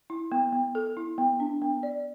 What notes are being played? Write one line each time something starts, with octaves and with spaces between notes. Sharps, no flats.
E4
B3
B3
A4
E4
B3
D4
B3
D5